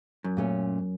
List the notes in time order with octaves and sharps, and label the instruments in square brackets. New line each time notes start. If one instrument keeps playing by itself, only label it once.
[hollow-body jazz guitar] F#2
[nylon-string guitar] A#2 A3 C#4